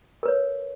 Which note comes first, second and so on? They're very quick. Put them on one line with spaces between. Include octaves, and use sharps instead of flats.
A#4 B4 C#5